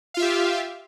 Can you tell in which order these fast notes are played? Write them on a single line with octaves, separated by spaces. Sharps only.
F5 F4 E5 G4